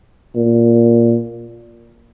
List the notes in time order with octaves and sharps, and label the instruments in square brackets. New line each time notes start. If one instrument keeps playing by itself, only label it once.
[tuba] A#2